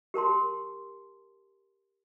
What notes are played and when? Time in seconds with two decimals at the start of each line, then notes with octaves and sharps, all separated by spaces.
0.14 G4 A#4 A5 C6